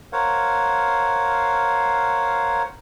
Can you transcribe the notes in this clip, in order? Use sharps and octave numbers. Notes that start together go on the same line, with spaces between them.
A#4 C5 C#5 F5 F#5